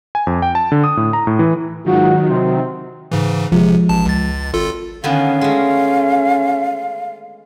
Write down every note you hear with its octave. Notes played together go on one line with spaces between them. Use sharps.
G#5
F2
G5
A5
D3
D#6
A2
A#5
A2
E3
G#2 D#3 F#3 F4 F#4
C3 C4
G#2 C#3 E3
G1 C3 F3 G#3
A1 A5
C#2 A6
G#1 F4 A4
D3 D#3 B3 C#4 F5
G#3 A3